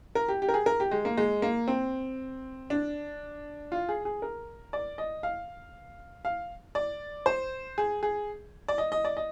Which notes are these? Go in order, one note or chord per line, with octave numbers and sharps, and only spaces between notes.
A#4
G4
G4
A#4
G#4
A#4
G4
G#3
A#3
G#3
A#3
C4
D4
F4
G#4
G#4
A#4
D5
D#5
F5
F5
D5
C5
G#4
G#4
D5
D#5
D#5
D5
D#5